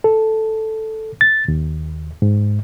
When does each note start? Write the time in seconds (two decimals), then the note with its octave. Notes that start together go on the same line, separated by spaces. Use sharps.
0.04 A4
1.21 A6
1.48 D#2
2.22 G#2